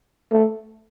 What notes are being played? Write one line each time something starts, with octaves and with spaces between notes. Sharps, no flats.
A3